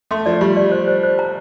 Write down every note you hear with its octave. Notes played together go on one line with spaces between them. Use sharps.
A3 C6
F3 D5
G3 G4
D5
C5
C5
C5
A#5